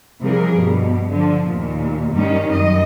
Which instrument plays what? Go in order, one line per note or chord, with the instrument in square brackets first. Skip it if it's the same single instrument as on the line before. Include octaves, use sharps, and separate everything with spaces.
[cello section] C3 E3 F3 G3 G#4 A#4
G2 B2
D3 F3
D#2 A#2
G2 D#3 G3 C#4
F#2 D#5